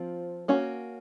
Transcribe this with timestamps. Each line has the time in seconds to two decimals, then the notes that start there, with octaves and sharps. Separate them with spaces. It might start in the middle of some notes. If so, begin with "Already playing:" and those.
Already playing: F3 C4 F4
0.48 A#3 C#4 F#4